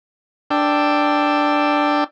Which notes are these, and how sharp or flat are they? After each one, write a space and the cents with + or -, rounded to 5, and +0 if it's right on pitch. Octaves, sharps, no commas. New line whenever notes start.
D4 +5 G5 +0 E6 +10